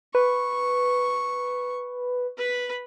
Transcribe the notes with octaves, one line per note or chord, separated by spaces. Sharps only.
B4 C#6
B4 B5